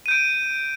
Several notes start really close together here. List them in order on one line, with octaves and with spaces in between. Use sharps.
D#7 G6 D7